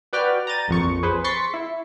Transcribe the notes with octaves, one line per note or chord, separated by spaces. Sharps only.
F#4 B4 D5 G5 F6
A#5 G6 A6 D#7
A#1 F2 C#6
G#4 B4 C5
C6 C#6 A6 B6 C#7
E4